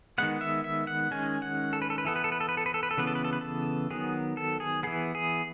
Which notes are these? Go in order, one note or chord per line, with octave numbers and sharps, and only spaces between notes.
D#3 G#3 B3 F#5
E5
E5
F#5
D#3 G#3 C#4 G#5
F#5
A4
B4
A4
B4
E3 B3 A4
B4
A4
B4
A4
B4
A4
B4
A4
B4
A4
C#3 E3 B3 B4
A4
B4
A4
B4
A4
D#3 F#3 B3 G#4
A4
G#4
E3 B3 G#4
G#4